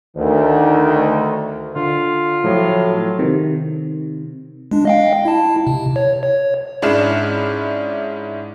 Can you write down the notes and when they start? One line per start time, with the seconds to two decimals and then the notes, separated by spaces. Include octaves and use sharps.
0.16 D2 D#3
1.76 D3 F4
2.44 A2 F3 F#3
3.19 C3 D#3
4.71 G#3 D4
4.85 D#5 F5 G5
5.25 E4 A5
5.67 C3
5.96 C#5
6.23 C#5
6.82 G#2 C#4 D4 E4 F6 E7